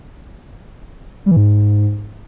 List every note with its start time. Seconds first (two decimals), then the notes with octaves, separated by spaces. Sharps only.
1.26 G3
1.31 E3
1.36 G#2